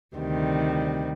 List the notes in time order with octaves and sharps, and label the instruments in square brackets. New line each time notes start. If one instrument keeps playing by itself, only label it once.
[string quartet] D2 C3 D#3 G3